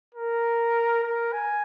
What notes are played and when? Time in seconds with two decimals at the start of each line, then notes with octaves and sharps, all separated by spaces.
0.15 A#4
1.03 A#4
1.33 G#5